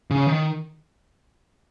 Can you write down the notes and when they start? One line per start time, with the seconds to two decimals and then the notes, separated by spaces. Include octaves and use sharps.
0.11 C#3
0.28 D#3